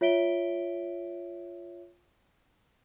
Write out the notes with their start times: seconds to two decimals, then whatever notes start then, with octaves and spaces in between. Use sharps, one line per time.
0.01 F4 C#5 E5 B6 D7 G7